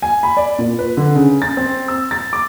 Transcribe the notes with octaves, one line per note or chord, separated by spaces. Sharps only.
G#5
B5
D5
A#2
B4
D3
C#3
A6
C4
E6
A6
D6